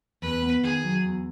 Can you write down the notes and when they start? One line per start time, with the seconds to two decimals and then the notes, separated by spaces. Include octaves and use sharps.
0.22 E2 B4
0.42 B3
0.63 D#3 G#4
0.84 F#3
1.04 E2